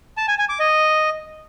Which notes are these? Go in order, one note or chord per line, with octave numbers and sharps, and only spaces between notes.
A5
G#5
G#5
D6
D#5